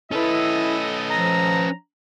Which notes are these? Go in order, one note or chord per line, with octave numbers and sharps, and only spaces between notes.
C#4 E4 A4 B4 D#5
F3 A#5